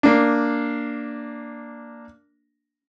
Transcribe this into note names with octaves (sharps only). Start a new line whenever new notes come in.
A#3 D4